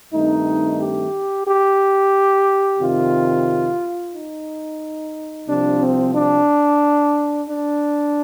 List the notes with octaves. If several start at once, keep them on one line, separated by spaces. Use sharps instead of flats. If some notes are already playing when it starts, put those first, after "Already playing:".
G2 D#3 A3 C4 D#4
G4
G4
F2 C3 D#3 F4
D#4
C2 C3 F3 D4
C4
D4
D4